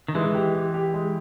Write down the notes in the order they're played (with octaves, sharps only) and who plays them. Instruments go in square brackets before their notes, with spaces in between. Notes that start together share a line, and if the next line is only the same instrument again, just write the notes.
[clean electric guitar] D#3
[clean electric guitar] E3 [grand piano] G#3
[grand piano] G4
G4
G4
G#3